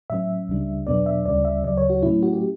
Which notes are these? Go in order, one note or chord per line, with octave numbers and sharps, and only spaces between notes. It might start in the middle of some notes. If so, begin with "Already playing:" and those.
A2 F#3 C#4 E5
C#2 C#3 G3 D4
E2 B2 F#3 B3 D4 D5
E5
D2 C#3 G3 C#4 D5
E5
D2 C#3 F#3 D5
C#5
F#4
A2 F#3 A3 C#4 E4
F#4
G4